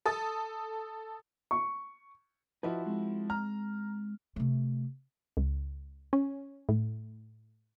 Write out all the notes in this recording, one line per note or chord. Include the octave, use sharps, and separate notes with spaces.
A4 D#6 A6
C#6
F3 E4 F#4 B4 D#5 E5
G#3 C4
A#5 F6
C3 A3
C#2
C#4
A2